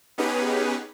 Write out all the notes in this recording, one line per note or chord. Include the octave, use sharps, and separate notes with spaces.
B3 C#4 D#4 G4 G#4 B4